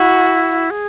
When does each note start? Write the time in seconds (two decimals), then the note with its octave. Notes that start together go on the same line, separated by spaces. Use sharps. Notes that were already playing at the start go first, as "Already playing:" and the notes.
Already playing: E4 F#4
0.71 G#4